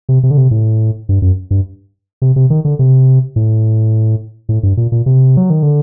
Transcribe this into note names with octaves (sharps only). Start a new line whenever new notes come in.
C3
C3
D3
C3
A2
G2
F#2
G2
C3
C3
D#3
D3
C3
A2
A2
G2
A#2
A#2
C3
F#3
D#3
D3